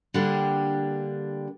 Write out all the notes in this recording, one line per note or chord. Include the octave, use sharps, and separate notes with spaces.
D3 G3 A#3 D4 G4